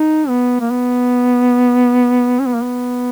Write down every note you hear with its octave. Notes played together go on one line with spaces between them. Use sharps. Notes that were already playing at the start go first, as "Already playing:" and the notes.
Already playing: D#4
B3
A#3
B3
C#4
B3
A#3
B3